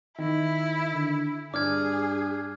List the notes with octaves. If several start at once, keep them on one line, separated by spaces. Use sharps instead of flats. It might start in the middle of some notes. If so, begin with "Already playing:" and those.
D#3 E4
D3
G2 D4 G#4 D6 F6 G#6